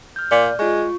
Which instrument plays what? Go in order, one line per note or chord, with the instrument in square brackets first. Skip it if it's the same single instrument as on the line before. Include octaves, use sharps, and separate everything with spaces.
[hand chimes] F6 G6
[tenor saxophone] A#2 [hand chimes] D5
[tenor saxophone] G#3 [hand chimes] F4 C#6